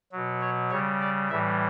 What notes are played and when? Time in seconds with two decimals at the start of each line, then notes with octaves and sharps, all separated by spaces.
0.12 B2 F#3
0.41 C#5
0.70 C#3 G3 C#5
1.01 D5
1.30 A2 E3 G3 E5